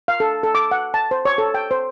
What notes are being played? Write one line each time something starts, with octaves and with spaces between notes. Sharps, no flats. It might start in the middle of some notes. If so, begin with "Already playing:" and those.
F5
A4
A4
D6
F#5
A5
C5
C#5
A4
G5
C5